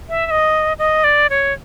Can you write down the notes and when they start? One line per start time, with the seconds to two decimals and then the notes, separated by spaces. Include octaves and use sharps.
0.09 E5
0.26 E5
0.31 D#5
0.79 D#5
1.04 D5
1.30 C#5